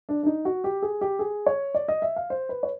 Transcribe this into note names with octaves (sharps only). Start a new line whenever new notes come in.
D4
D4
D#4
F#4
G4
G#4
G4
G#4
C#5
D5
D#5
E5
F5
C5
B4
C#5